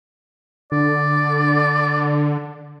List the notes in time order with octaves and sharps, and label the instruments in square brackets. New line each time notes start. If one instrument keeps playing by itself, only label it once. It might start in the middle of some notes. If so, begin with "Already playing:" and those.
[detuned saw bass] D3 [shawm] D5